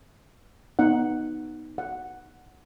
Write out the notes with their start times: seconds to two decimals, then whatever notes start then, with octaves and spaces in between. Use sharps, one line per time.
0.79 B3 D#4 F#5
1.78 F#5